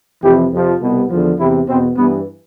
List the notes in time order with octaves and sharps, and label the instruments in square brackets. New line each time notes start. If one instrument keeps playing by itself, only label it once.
[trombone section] F2 C3 E3 G4
F2 C3 F3
C2 B2
E2 D3 F3
E2 C3 E3 E4
E2 B2 C4
G2 E3 B3